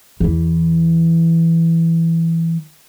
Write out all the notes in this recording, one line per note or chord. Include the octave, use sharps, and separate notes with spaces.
E2 E3